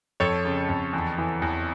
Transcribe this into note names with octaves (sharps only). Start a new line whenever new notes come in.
F2 A4 C#5
C#3
F2
E2
E3
E2